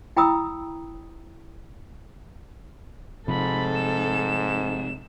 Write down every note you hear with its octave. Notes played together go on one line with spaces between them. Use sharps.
E4 G5 A#5 B5 D#6 E6
G#2 C3 F3 A4 B5
E7